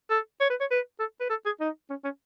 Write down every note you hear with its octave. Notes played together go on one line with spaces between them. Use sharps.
A4
C#5
B4
C#5
B4
A4
B4
A4
G#4
D#4
C#4
C#4